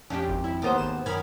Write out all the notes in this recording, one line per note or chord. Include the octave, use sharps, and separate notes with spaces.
F2 C#4 D4 G4
G#1
E4
D#2 B3 C5
G#1 E7
F#2 D#3 B5 F6 G#6